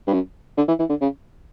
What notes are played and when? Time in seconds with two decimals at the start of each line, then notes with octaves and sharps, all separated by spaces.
0.07 G2
0.13 F#2
0.57 D3
0.68 E3
0.79 E3
0.89 D3
1.01 C#3